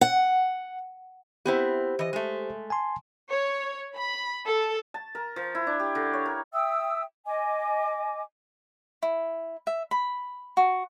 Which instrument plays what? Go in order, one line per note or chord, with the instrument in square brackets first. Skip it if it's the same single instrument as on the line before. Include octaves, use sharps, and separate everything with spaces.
[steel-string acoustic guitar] F#5
[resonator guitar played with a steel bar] B3 C4 E4 [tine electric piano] G4 C5
[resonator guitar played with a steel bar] E3 D#5
G#3 A3
[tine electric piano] G#5 A5 C6
[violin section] C#5
B5
A4
[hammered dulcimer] A5
A#4
F3
E4
D4
G4
D3
C#5
A#4
[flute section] E5 G5 D#6 E6
D#5 G#5 D6
[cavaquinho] E4
E5
B5
F#4